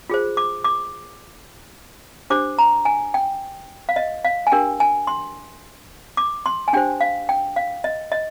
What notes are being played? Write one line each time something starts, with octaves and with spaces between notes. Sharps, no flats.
F4 G#4 C5
D6
D6
D4 G4 C5 D6
A#5
G#5
G5
F5
D#5
F5
G#5
D4 G4 A#4 G5
G#5
C6
D6
C6
G#5
D4 G4 C5 G5
F5
G5
F5
D#5
D#5